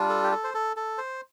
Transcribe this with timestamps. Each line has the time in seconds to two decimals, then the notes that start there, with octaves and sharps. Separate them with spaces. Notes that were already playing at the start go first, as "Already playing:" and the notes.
Already playing: G3 D4 F4
0.09 A4
0.24 G4
0.32 A4
0.44 C5
0.54 A4
0.76 A4
0.98 C5